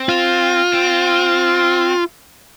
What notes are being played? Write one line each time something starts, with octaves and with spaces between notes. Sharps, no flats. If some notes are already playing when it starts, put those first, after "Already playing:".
Already playing: C4
F4
C4